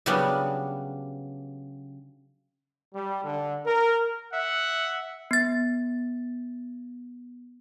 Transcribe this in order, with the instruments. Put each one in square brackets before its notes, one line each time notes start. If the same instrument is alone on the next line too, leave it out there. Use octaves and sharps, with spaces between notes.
[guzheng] C#3 F#3 G3 B3 C#4 D4
[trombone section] G3
D3
A#4
[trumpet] E5 [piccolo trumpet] F#5
[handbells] B3 A6